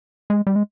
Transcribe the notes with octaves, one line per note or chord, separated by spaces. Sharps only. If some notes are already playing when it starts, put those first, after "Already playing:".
G#3
G3
G#3